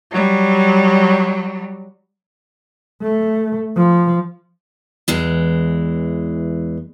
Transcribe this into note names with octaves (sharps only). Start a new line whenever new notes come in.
F#3 G3
A3
F3
E2 E3 G#3